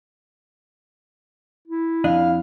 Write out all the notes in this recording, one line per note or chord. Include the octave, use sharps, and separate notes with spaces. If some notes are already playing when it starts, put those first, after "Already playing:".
E4
F2 D4 D#5 F5